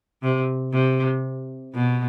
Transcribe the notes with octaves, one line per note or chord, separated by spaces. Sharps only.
C3
C3
B2